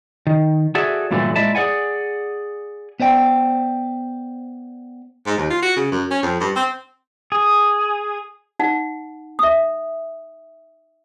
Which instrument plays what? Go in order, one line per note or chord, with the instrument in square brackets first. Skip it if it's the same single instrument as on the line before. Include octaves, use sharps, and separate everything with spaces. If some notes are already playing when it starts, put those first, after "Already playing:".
[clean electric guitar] D#3
F#4 G#4 A4 D5 E5
G2 A#2 D3 E3 F#3 A3
A#2 G#3 E4 D5 E5 A5
G#4 B4 D5 F#5 G#5
B3 C5 D5 G5
[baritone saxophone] G#2
D#2
F4
F#4
C#3
F#2
C#4
F2
G2
C4
[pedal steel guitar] G#4
[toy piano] D#4 F#5
E5 D#6